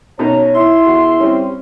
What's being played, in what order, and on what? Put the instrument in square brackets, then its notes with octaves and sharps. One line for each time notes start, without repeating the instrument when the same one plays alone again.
[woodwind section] F#2 A#5 [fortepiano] B2 C#4 D#4 [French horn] C#5
[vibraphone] E4 [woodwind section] E5 C6
[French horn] E2 [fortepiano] F#4
[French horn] G3 [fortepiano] C4 C#4